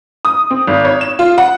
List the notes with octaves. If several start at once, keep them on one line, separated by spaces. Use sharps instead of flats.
D#6
C4
G#1
C#5
E7
F4
F#5